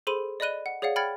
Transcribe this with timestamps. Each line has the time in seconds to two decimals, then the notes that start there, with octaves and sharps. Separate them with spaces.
0.07 G#4 A4 C5 B5 C6 D#7
0.40 D5 D#5 B5 F#6 D#7 G7
0.66 F#5
0.82 G#4 C#5 D5 F5 F#5
0.96 G5 B5 F6 G#6 A6 C#7